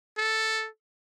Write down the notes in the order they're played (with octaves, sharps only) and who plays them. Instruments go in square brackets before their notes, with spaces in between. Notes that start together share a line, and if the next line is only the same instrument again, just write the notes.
[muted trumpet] A4